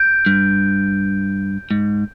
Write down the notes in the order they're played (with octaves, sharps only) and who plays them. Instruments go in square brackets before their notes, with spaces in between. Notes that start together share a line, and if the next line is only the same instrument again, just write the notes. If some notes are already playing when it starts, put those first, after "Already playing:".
Already playing: [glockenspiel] G6 D7
[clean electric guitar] G2
G#2